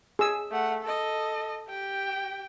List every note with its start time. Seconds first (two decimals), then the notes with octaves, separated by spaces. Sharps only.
0.19 G#4 E6
0.51 A3 F#5
0.83 A4 D#5
1.69 G4 G5